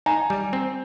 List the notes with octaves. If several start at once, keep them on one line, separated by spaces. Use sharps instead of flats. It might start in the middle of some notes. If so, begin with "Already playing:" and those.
D#4 G#5 A#5
G3
C4